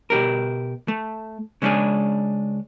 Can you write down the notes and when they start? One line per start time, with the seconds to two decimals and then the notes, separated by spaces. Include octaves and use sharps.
0.10 B2 G4 A#4
0.88 A3
1.62 C#3 G#3 C#4 D4 G#4